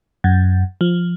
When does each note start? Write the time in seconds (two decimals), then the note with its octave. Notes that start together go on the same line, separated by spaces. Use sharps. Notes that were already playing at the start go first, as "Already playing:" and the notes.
0.24 F#2
0.81 F3